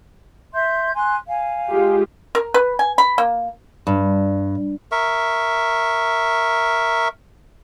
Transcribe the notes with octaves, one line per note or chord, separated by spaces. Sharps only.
E5 C6 G6
G#5 C6 F#6
F5 G#5
G#3 F4 G4
A#4
B4
G#5
B5
A#3
G2
A#4 E5 C#6